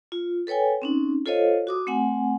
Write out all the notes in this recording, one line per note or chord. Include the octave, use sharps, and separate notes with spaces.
F4
A4 B4 C#5 G5 G#5
C4 C#4 D#4
F4 A4 C5 C#5 D#5 F5
F#4 D6 D#6
A3 C4 F#5 G#5